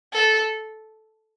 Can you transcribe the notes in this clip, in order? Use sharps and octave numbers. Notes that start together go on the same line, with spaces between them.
A4